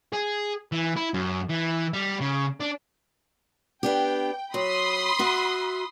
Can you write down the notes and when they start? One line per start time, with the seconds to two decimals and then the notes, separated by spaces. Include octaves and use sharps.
0.13 G#4
0.72 E3
0.96 E4
1.14 F#2
1.50 E3
1.93 G3
2.20 C#3
2.60 D4
3.83 B3 D4 G4 G5
4.54 F#3 B5 C6 D#6
5.19 F#4 E5